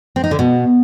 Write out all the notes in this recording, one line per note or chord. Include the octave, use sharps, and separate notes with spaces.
C4
D#4
D3
B2